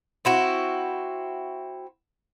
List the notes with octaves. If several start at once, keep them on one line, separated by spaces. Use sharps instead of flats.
C4 E4 F#4